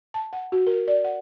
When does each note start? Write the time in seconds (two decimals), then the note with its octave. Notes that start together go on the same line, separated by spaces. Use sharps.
0.14 A5
0.33 F#5
0.52 F#4
0.67 A#4
0.88 D5
1.04 F#5